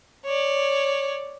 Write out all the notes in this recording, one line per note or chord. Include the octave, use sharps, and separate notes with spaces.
C#5 D5